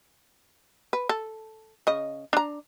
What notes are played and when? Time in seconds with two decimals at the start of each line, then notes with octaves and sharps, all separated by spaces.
0.93 B4
1.09 A4
1.87 C#3 D#5
2.33 D4 A#5